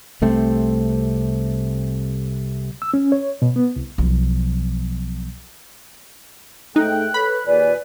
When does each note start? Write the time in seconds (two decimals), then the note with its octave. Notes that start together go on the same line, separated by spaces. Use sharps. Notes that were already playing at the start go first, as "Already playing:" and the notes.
0.22 C2 C3 A3 C4
2.82 E6
2.94 C#4
3.12 C#5
3.42 B2
3.56 B3
3.76 C2
3.98 B1 F3
6.76 G#2 A3 D#4 G5 F#6
7.14 A4 B4 C#5 B5
7.47 D#2 A#2 G#4 B4 D5